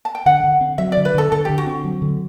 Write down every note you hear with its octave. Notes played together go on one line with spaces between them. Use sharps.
A5
G5
D3 F#5
D3
C4
F#3 E5
D3 D5
B4
D3 A4
D3 A4
D3 G4
F#4
C4
F#3
D3